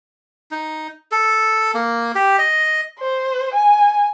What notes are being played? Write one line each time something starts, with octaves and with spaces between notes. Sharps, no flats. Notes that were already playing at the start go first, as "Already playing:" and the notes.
D#4
A4
A#3
G4
D#5
C5
G#5